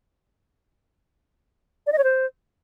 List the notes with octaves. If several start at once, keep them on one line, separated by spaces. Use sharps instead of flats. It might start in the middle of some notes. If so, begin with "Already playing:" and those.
D5
D#5
C#5
C5